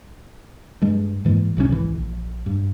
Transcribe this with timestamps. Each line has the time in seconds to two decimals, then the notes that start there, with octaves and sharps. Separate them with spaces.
0.82 G2 G#3
1.25 G#2 E3 G#3 A#3
1.57 B1 C3 D#3 C#4
1.69 G#1 C#2 E3
1.95 A#1
2.46 G2